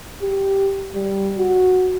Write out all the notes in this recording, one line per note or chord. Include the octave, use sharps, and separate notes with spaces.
G4
G3
F#4